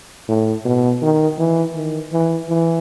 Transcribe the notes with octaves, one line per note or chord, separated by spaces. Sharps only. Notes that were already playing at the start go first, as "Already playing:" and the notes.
A2
B2
D#3
E3
D#3
E3
E3